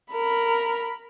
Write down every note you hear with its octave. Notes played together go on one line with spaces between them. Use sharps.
A#4 B5